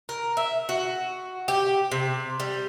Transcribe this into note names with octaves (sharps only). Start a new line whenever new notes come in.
A#4
E5
F#4
G4
C3
G3